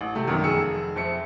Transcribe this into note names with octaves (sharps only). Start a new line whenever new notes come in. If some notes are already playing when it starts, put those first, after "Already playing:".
A1
C3 A3
G#1 F#2 B2 D#3
F1 G#4 E6 C#7
F2 C4 E5 C#7